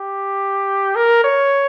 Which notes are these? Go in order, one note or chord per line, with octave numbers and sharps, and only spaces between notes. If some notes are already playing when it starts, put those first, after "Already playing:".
Already playing: G4
A#4
C#5